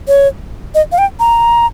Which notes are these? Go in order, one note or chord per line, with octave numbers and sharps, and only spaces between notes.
C#5
D#5
F5
G5
A#5